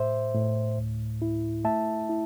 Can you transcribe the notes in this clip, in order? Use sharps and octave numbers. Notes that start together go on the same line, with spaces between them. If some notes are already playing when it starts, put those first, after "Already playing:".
Already playing: A2 C5 E5
A2
D2
E4
A3 E5 A5
E4